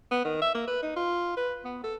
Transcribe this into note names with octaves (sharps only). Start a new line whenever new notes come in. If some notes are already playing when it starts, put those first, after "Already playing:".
B3
D#3
E5
A#3
B4
D#4
F4
B4
B3
A4